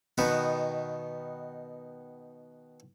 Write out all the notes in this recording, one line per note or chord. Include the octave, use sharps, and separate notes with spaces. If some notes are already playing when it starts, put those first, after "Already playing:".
B2 D#3 B3 B4